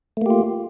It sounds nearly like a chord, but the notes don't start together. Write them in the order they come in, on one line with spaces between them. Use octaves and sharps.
A3 A#3 G4 F4